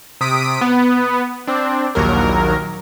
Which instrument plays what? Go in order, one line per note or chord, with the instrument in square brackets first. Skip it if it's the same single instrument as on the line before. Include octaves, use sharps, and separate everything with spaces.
[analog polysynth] C3 D#6 B6 D7
B3
C4 D4
A#1 D#2 F#3 A#4